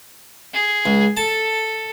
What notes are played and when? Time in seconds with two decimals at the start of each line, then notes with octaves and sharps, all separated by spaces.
0.53 G#4
0.86 C#2
1.17 A4 A5